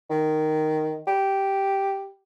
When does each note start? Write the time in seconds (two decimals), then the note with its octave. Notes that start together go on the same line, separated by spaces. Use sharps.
0.10 D#3
1.07 G4